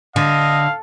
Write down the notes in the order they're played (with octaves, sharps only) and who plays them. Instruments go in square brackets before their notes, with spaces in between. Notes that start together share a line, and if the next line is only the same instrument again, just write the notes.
[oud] D3 [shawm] D#5 [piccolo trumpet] F5